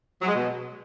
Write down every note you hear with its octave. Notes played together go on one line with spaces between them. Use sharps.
F#3
G#3
B2